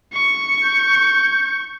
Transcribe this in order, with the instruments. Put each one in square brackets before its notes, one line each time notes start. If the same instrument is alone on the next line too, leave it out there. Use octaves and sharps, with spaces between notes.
[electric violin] C#6
[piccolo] G6